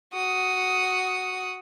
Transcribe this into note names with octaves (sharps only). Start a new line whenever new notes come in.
F#4 D#6